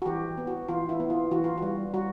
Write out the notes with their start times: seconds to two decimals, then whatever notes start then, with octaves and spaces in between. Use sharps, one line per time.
0.02 F#4
0.06 E3 G4
0.37 B3
0.47 F#4
0.68 E3 F4
0.89 E4
1.00 B3
1.10 F4
1.31 E3 F#4
1.44 F4
1.57 G3 F#4
1.94 G3 F#4